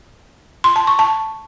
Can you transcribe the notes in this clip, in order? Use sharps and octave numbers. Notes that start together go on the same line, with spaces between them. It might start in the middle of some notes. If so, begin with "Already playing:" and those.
C6
A5
C#6
A5